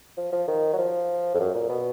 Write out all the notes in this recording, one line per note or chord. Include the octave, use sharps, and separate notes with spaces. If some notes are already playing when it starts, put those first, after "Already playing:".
F3
F3
D#3
F#3
F3
F2
F#2
A#2
B2